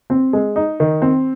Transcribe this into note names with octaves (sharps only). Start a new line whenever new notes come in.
C4
G#3
D#4
D#3
C4